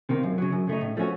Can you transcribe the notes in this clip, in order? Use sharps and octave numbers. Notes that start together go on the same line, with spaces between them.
C3 D#3 A#3
F#2
C#3 F#3
F#2
C#3 A3 D#4
A2
F3 A3 C#4 F#4